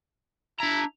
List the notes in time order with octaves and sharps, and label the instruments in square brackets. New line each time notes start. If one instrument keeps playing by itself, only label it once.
[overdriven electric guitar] D4 A#5 [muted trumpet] E4